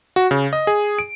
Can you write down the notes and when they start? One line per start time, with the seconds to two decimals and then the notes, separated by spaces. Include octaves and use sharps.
0.16 F#4
0.31 C#3
0.53 D#5
0.67 G#4
0.99 D7